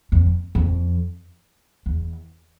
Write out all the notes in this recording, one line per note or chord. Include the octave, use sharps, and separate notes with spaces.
F2
F2
E2